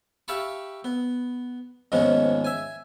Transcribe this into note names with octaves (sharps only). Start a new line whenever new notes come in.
G4 E5 F5 A5 B5 C#6
B3
D#2 G#2 F3 G#3 B3 C#4
E5 G#5